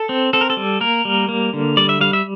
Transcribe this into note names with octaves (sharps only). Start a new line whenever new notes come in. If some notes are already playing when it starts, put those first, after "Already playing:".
Already playing: A4
C4
C4 A4
A#4
A4
G3
A#3 A#4
G3
A#3
D3
G3 D5
E5
G3 F5
E5